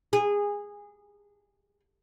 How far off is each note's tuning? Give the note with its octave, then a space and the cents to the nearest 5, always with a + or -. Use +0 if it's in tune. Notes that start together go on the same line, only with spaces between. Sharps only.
G#4 -20